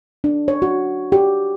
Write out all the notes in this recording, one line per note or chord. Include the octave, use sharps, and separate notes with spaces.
D4
C#5
F#4
G4